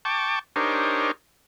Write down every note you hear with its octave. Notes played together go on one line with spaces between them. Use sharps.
G5 A5 C#6 D6
D4 D#4 G4 A#4 C5 C#5